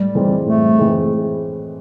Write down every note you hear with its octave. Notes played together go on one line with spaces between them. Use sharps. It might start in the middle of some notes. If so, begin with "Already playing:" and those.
Already playing: A2 G3
E3 G#3 C4 D#4
A2 A3
E3 G#3 C4 D#4